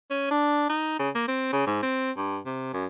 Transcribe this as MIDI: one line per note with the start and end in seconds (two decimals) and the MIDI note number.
0.11 0.31 61
0.31 0.69 62
0.70 0.97 63
1.00 1.10 49
1.15 1.26 58
1.28 1.51 60
1.53 1.65 49
1.67 1.79 44
1.83 2.12 60
2.17 2.39 43
2.46 2.74 48
2.74 2.86 42